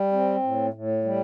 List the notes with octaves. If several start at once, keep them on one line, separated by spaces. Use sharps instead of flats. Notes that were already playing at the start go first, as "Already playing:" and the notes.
Already playing: G3
C4
A2
A2
G3